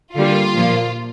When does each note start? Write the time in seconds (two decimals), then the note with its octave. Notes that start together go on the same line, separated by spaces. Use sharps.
0.15 D3 G3 A#3 F4
0.56 A#2 F3 A#3